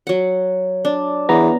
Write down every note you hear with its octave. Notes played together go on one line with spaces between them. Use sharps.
F#3 F#5
D4
E2 B3 A#5